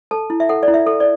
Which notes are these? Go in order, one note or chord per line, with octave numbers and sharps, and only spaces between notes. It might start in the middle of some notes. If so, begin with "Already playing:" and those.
A4 A5
E4
E5
A4 F#5
D5
E4
E5
A4
D5